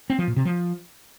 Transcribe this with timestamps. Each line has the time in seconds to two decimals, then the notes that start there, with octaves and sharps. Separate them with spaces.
0.10 C4
0.19 F3
0.28 A#2
0.36 C3
0.45 F3